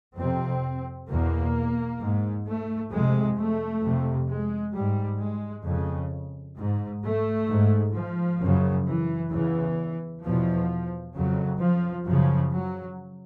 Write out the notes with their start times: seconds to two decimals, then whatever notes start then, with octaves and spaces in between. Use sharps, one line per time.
0.17 F2 C3 C4
1.09 E2 B2 A#3
2.00 G#2
2.47 A3
2.92 F2 C3 G#3
3.37 A3
3.83 F2 C3
4.28 G#3
4.75 G#2 G3
5.20 G#3
5.66 F2 C#3
6.58 G#2
7.04 A3
7.49 G#2
7.94 F3
8.41 F#2 C#3
8.87 E3
9.31 E2 C#3 E3
10.24 E2 B2 F3
11.15 F2 C#3 F#3
11.60 F3
12.06 F#2 C#3 F3
12.52 F#3